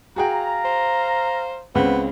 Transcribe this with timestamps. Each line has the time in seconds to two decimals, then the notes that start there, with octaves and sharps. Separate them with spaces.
0.16 F#4 G#4 F5 G5 A#5
0.65 C5
1.75 C#2 C#3 B3 C4